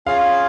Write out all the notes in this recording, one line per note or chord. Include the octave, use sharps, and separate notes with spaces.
C#4 F4 G#4 F5